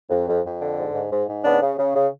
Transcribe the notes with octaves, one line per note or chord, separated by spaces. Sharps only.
F2
F2
F2
D3
G#2
G#2
G#2
G#2
C#3 B3 D4
C#3
C#3
C#3